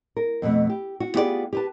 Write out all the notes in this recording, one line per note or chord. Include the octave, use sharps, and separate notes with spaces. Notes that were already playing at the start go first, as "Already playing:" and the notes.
A#4
F2 B2 A3
G4
F#4
B3 F4 G4 G#4 C5 D5
G4 B4 A5